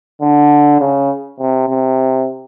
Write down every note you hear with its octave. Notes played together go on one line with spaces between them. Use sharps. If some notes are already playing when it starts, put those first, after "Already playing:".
D3
C#3
C3
C3